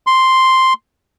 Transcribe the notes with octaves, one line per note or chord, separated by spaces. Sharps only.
C6